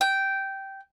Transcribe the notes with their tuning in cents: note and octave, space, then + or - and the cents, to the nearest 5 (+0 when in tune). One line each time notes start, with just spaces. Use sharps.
G5 -10